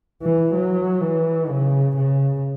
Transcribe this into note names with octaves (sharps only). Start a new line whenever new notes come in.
E3
F#3
E3
C#3
C#3